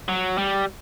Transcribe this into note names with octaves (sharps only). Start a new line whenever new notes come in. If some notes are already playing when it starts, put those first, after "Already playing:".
F#3
G3